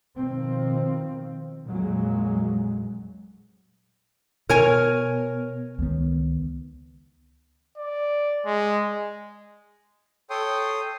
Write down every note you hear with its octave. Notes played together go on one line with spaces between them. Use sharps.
B2 D#3 F3 C4
A#1 F2 A#2 F#3 G#3
B2 A#4 C#5 G#5
C#2 D#3 B3
D5
G#3
A4 C#5 G5 C6 D#6